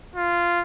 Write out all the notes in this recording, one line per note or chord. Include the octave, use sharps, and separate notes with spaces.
F4